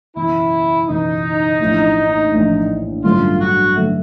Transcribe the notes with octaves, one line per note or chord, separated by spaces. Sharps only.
F#1 E2 B2 E4
F#1 E2 B2 D#4
A#1 A2 E3 A3
A#1 A2 E3 A3
A1 G2 D3 F#3 A3 F4
F#4
D3 F#3 A3